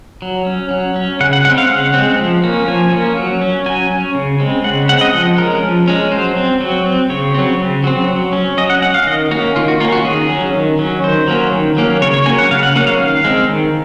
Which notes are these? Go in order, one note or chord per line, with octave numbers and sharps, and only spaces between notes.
F#3
C#4
F#3
C#4
C#3 F#5
F#5
G#3 C4 F#5
F5
C#3 F#5
G#3 C4
F3
A#3 C#4
F3 G#5
A#3 C#4
F#3
C#4
F#3 G#5
C#4
C#3
G#3 C4
C#3 F#5
G#3 C4 F#5
D#5
F3 F#5
G#3 C#4 A#4
F3
G#3 C#4
F#3 C5
C4
F#3
C4
C#3 C#5
F#3 C4
C#3
F#3 C4
F#3
C#4
F#3 D#5
F#5
C#4 F#5
F5
D#3 D#5
A#3 C#4 F#4
D#3 F4
F#4
A#3 C#4 F4
F#4
D#3 G#4
F#3 C#4
D#3
F#3 C#4
D#3 C5
F#3 A#3 C#4
D#3
F#3 A#3 C#4
C#3 C#5
C#5
F#3 A#3 C#4 G#5
F#5
C#3 F5
F#5
F#3 A#3 C#4 F#5
F5
D#3 F5
G#3 C4
D#3